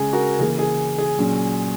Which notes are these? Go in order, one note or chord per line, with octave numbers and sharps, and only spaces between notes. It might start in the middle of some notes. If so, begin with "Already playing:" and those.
Already playing: C#3 G#3 C#4 G#4
F#4 A#4
C#3 E3 A#3 G#4
G#4
G#4
A#2 F#3 C#4